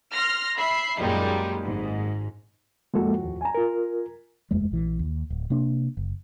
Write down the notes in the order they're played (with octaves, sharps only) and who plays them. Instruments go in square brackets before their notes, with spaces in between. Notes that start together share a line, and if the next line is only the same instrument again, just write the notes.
[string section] C6 F6 A#6
E5 B5 C7
F#2 A#2 G3 G#3 D#4
G#1 G#2
[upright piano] F2 A2 F#4 [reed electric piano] G#3 A#3 A4
[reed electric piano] D#2
[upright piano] G#5 A#5
[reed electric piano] F4 A#4
[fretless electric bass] F#1 E2 G#3 A3
A#1 E3
D#2
D1
C3 A#3 D4
F#1